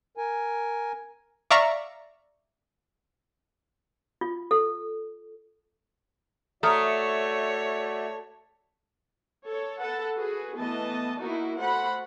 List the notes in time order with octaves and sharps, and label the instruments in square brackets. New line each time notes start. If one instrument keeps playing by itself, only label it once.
[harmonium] A#4 G#5
[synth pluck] D5 E5 F5 A#5 C#6
[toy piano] F4
A4
[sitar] A3 [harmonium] F#4 D5 E5 [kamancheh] C#5 [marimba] A#5 D#6 F6
[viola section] A4 C#5
A4 B4 F#5 A5
F#4 G#4 B4
E3 A3 B3 D#5 A5
A#3 D#4 E4 F#4 A#4
A3 F#4 C5 F#5 B5